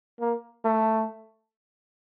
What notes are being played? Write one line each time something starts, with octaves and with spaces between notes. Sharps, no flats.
A#3
A3